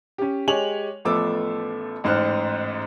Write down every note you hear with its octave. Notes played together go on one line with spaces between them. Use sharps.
C#4 G4
G#3 G4 C#5 G#5 F7 F#7
A1 F3 A3 B3 D6 E6
A1 G#2 C5 F6 F#6